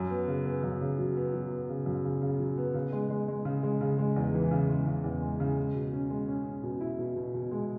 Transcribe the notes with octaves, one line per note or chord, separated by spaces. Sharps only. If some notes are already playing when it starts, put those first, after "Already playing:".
Already playing: F#2
B3
C#3
B3
F#2
C#3
F#3
B3
F#3
B3
C#3
F#2
C#3
C#3
F#3
B3
C#3
G#3
G#3
G#3
C#3
G#3
C#3
G#3
E2
E3
C#3
G#3
C#3
E2
G#3
C#3
G#3
B2
C#4
G#3
C#4
C#4
B2
E4
B2
B2
B2
G#3